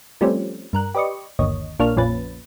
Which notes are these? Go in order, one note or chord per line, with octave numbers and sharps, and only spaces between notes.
F3 G3 A3 C4 C#4
G2 A#4 F#6
G4 B4 D5 D#5 C#6
G1 D#2 C#5 D#5
A#1 A#3 D4 C#5 F6
A#1 F2 A#2 C#4 B4 A6